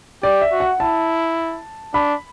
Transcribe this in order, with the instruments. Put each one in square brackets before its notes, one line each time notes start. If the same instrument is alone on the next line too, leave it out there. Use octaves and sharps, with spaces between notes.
[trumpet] G4 [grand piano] D5
[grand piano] E5
[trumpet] F#4
[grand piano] F#5
[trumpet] E4 [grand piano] A5
[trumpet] D4 [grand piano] B5